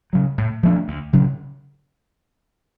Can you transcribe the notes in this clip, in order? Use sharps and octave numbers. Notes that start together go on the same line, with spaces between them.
C#3 F#3
A2
F3 A3 D4
D2
C#3 F#3